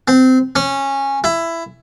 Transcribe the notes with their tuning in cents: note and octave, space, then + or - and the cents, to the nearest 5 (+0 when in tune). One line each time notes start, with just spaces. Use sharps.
C4 -20
C#4 -15
E4 +15